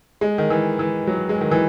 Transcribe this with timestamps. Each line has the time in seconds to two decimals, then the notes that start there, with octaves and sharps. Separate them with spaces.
0.21 G#3
0.38 D#3
0.50 E3
0.79 E3
1.07 F#3
1.29 G#3
1.41 D#3
1.51 E3